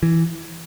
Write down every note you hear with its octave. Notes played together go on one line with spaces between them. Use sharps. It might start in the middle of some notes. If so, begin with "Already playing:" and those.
E3